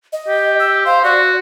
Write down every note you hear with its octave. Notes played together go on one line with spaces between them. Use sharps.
D#5
G4
E6
C5 F5
F#4 D5